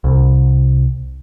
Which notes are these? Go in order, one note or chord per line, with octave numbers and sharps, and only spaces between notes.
C2